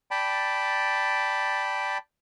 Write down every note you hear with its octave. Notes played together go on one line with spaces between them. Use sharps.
D5 G5 A5 B5